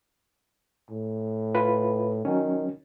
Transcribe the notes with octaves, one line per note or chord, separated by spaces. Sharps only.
A2
F4 B4
D#3 F#3 C#4